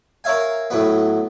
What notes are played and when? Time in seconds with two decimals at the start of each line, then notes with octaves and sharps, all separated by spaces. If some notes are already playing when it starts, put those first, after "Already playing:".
0.24 A#4 C#5 E5 F5 G#5
0.70 A2 F#3 B3